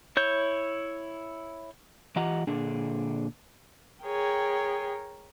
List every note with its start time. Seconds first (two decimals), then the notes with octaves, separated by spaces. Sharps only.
0.17 E4 C#5 G6
2.16 E3 F4 G4 D#5 F#5 A#5
2.47 A#2 D3 D4 G#4
4.05 G#4 A#4 C#5 G5